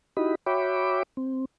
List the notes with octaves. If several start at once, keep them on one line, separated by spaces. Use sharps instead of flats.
D#4 E4 F#4 G4 D#5 B5
F#4 C#5 E5 G5 B5 D6
C4